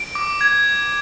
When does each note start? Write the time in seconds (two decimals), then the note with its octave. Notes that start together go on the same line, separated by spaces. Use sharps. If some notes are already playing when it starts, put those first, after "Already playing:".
Already playing: D7
0.15 D6
0.41 G#6